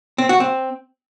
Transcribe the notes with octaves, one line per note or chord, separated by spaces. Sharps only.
C4
F#4
C4